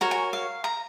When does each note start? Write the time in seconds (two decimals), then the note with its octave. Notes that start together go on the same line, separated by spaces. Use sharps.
0.01 F#4 A#4 C#5 A#5
0.11 G#5
0.33 F5
0.64 A#5